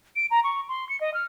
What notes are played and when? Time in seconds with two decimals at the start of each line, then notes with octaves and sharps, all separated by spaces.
0.16 D7
0.31 A#5
0.44 C#6
0.69 C6
0.89 C#7
1.01 D#5
1.14 F6